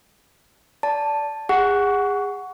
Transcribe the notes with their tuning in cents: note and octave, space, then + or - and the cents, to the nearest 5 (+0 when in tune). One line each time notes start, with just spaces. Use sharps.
D5 -20 A5 +0
G#4 -30 F#5 +0 C#6 +20